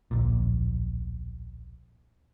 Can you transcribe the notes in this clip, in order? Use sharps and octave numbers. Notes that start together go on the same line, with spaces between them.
D1 A#1 A#2